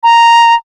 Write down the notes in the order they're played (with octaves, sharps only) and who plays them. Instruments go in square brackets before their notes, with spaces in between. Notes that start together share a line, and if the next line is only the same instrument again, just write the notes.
[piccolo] A#5